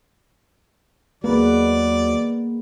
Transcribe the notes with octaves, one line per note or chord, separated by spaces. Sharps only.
D#2 F#3 G#3 A#3 B3 B4 D5